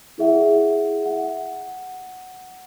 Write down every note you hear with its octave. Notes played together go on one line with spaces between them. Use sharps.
E4 G#4 E5 F#5
F#5